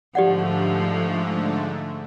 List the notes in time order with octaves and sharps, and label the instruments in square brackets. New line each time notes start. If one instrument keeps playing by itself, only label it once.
[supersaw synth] G#2 D3 A3 [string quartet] F3 [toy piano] G4 D5 F#5